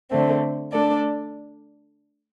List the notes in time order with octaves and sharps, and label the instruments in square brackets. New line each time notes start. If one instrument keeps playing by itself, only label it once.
[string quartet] D3 A3 C4
A3 D4 A4 D5